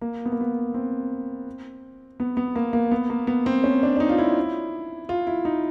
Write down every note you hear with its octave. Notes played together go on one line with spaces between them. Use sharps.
A#3
B3
A#3
B3
C4
B3
B3
A#3
A#3
B3
A#3
B3
C4
C#4
D4
D4
D#4
F4
E4
F4
E4
D#4